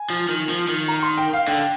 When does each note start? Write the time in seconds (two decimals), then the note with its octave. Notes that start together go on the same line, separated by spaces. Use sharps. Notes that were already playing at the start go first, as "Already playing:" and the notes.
Already playing: G#5
0.10 F3
0.29 D#3
0.49 F3
0.69 D#3
0.88 A#5
1.03 C6
1.18 G5
1.33 F5
1.48 D3 G5